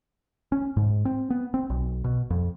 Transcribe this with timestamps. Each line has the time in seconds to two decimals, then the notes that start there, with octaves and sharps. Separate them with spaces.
0.52 C#4
0.77 G#2
1.05 C4
1.30 B3
1.54 C4
1.70 B1
2.04 B2
2.30 F2